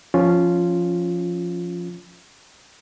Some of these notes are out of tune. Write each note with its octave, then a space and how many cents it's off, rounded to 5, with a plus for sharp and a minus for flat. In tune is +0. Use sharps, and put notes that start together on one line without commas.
F3 +0 C#4 +0 F4 +0